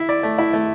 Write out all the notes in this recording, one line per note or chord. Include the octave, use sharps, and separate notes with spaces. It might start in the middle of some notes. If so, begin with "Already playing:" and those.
Already playing: E4
D5
A3
E4
A3